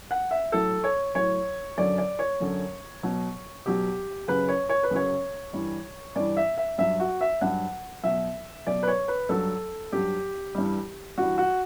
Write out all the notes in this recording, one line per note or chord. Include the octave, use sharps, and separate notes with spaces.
F#5
E5
A2 F#3 A4
C#5
A2 F#3 C#5
F#2 D3 F#3 D5
D5
C#5
F#2 D3 F#3
B2 F#3
B2 F#3 G4
F#2 C#3 F#3 B4
C#5
C#5
B4
F#2 C#3 F#3 C#5
G2 E3 G3
G2 E3 G3 D5
E5
E5
G2 F#3 E5
F#4
E5
G2 F#3 F#5
B2 F#3 E5
B2 F#3 D5
B4
C#5
B4
G2 F#3 A4
G2 F#3 G4
G2 E3 G3
G2 E3 G3 F#4
F#4